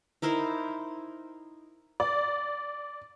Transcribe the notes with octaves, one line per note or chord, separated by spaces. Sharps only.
D#4 E4 A#4 C5
D5